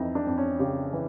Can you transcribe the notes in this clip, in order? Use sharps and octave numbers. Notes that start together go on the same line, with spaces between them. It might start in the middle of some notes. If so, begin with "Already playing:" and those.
Already playing: F2 E3 D#4 E4
D4
F2
C#4
C#3 G4
E3